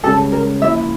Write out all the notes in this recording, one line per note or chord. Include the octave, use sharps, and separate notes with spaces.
C#2 C#3 G3 C#4 A4
A#4
F3 A#3 E4 E5